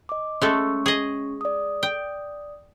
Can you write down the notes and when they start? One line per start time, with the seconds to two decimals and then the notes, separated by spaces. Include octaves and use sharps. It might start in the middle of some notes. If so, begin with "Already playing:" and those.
0.09 D#5 D6
0.42 G#3 A3 C#4 A4 C#6
0.86 G#4 D#5
1.41 D5 D#6
1.83 G5